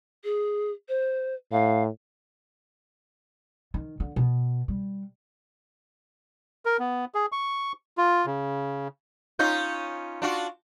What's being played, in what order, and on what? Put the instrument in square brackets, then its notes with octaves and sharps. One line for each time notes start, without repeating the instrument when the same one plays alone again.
[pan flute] G#4
C5
[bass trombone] A2 [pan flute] F5
[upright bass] D#3
D3
B2
G3
[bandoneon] A#4
B3
G#4
C#6
F4
C#3
[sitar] C#4 D#4 F4 [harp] G6
[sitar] D4 F4 F#4